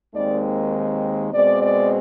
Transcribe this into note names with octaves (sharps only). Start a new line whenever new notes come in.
D#2 D#3 G#3 C4 D5
B2 G#3 C4 D5
D5